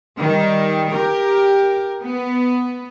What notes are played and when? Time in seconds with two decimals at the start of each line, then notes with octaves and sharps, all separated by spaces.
0.19 D#3 G3
0.93 G4 A#4
2.02 B3